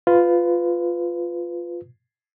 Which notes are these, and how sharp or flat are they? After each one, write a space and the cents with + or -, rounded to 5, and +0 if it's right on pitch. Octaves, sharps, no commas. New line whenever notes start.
F4 +0 B4 +20